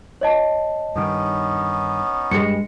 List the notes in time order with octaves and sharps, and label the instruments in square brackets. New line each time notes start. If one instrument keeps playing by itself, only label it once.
[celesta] C#5 D#5 A5
[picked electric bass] G2 D#3 [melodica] B3 C#4 D#4
[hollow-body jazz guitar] G2 G#3 [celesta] C#7